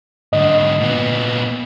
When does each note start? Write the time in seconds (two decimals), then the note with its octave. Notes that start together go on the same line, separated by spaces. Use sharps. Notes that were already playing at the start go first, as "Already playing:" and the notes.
0.33 G#2 D3 D#5
0.80 A#2 B3